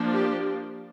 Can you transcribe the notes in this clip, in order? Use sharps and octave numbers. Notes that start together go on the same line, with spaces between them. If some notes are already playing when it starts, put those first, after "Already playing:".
Already playing: F3 A#3 D4
G4